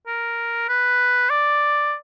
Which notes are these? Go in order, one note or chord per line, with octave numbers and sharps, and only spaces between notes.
A#4
B4
D5